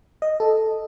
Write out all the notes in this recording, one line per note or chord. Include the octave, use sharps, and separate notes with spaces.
D#5
A4